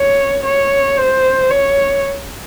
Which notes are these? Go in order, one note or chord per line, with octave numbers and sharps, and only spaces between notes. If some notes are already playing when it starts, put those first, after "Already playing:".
Already playing: C#5
C#5
C5
C#5